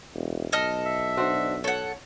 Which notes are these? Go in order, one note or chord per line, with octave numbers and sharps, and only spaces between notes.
E1
B1 A4 D#5 F6
E5
D4 F#4 C5
A4 C#5 F#5